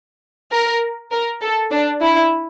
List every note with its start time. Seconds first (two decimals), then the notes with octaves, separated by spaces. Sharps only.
0.52 A#4
1.12 A#4
1.41 A4
1.71 D4
2.01 E4